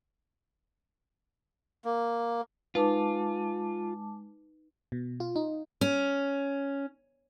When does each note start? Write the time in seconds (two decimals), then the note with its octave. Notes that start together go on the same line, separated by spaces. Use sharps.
1.85 A#3
2.75 G#3 D#4 F4 B4 A5 D6
4.92 B2
5.20 F4
5.36 D#4
5.81 C#4